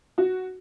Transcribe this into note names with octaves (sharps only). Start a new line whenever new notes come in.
F#4